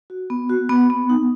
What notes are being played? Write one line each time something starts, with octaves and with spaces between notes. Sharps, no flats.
F#4
B3
F#4
B3
B3
D#4